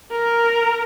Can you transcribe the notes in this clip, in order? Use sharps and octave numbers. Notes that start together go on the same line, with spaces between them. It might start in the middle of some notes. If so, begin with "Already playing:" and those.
A#4